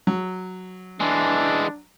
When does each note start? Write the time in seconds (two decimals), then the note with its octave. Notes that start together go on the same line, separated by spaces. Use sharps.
0.07 F#3
1.00 E3 G#3 D4